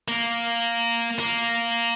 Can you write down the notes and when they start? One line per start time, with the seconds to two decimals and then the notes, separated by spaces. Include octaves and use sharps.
0.08 A#3
1.19 A#3